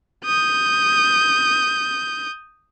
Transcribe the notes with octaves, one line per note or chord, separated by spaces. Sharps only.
D#6 G6